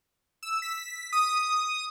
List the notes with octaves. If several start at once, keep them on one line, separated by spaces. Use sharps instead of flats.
E6
B6
D#6